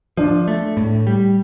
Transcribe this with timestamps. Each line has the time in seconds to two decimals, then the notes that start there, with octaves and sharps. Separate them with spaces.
0.17 F3 D4
0.48 A3
0.77 A2
1.07 G3